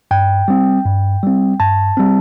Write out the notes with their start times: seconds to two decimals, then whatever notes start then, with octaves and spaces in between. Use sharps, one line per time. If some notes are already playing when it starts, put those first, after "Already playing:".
0.11 G2 G5
0.48 G3 C4
0.85 G2
1.23 G3 C4
1.60 G2 A5
1.97 G3 C4